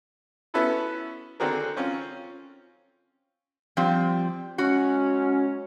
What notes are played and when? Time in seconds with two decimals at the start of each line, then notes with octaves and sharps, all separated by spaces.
0.54 B3 C#4 E4 F#4 A4 B4
1.40 D3 D#3 C4 F#4 G#4 A#4
1.77 C4 C#4 F4
3.77 F3 G3 C4
4.58 F#3 G#3 C#4 F#4 F#5